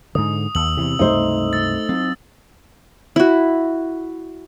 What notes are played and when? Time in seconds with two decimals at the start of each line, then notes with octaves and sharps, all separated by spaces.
0.15 G#2 D3 D#6
0.55 D#2 E6 F#7
0.77 E2 C3 E3
0.99 C#2 G2 C3 A3 D#4 C5
1.53 E6 A6
1.89 F#3 C4
3.16 E4 F#4